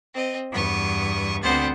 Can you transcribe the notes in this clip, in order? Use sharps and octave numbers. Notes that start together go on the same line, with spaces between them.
C4 D#5
E2 G2 B3 C#6 D#6
D2 B3 C4 C5 F#5 A6